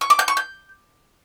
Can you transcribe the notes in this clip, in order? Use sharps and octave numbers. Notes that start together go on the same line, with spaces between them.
C#6
D6
G6
C#6
G6